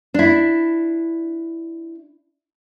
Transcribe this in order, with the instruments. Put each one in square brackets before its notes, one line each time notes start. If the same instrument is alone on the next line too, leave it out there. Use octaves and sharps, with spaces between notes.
[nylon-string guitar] D4 E4